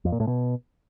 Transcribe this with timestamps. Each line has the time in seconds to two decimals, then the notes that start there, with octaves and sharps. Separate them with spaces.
0.05 F2
0.12 A#2
0.20 A2
0.27 B2